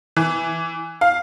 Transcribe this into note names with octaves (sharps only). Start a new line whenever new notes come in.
E3
F5